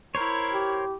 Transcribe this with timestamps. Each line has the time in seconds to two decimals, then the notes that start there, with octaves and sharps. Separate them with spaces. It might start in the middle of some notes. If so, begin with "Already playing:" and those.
0.15 E4 A#4 C5 C#5 C#6
0.52 G4